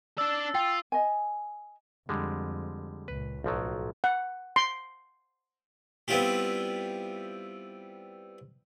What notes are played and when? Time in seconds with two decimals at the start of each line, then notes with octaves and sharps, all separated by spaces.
0.18 D4 D5 E6 A6
0.55 F4 G5
0.92 D#5 G#5
2.09 F2 D3 G3 G#3
3.08 C#2 A#2 B4
3.44 B1 A2 F3 F#3
4.04 F#5
4.56 C6
6.08 G3 B3 C4 E4 F4 G4